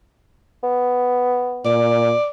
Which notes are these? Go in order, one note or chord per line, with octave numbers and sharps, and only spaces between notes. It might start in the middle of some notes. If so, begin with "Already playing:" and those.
B3
A#2 D5